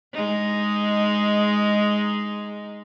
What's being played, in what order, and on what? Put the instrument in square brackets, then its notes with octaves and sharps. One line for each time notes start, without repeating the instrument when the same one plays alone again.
[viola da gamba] G#3 D#4